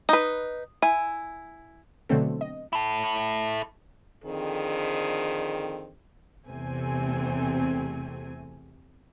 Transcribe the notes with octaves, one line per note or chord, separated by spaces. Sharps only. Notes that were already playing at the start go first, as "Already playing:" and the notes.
D#4 B4 D#6
E4 G#5
B2 D3 F#3 A3 C4 A4
D#5
E4 A4
F2 D3 D#3 C4 G#4
E2 C3 A3 C4 G#5